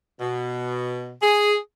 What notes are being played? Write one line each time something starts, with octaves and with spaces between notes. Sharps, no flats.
B2
G#4